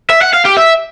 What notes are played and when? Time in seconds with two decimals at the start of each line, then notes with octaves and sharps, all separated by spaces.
0.10 E5
0.22 F#5
0.34 F5
0.45 G4
0.57 E5